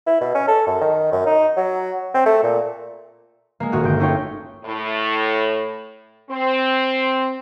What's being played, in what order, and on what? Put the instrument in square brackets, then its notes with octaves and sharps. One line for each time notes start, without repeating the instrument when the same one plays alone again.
[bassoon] E4
B2
C#4
A4
F#2
D#3
F#2
D#4
F#3
C4
A3
A#2
[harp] G#3 A#3
D#1 F#4 G#4 A#4
G1 G6 D7
A3 C#4 D#4 F4 C#5 G5
[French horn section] A2
C4